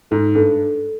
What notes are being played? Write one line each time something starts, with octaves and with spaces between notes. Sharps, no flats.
G#2 A4
G2 A4